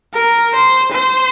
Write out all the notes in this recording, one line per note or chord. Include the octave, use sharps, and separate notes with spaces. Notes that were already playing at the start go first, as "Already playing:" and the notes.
A#4
C5
C5